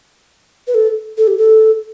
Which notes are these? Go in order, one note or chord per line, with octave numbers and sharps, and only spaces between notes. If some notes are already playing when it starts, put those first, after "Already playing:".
B4
A4
A4
G4
A4